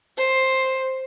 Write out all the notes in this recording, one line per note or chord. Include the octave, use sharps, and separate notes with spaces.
C5